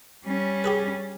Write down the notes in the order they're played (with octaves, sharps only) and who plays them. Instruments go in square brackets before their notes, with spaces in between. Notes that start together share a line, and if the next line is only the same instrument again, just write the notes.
[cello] G3 C#4
[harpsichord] G4 G#4 B4